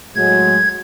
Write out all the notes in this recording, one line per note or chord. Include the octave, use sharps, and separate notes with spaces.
A2 F#3 G#3 G#6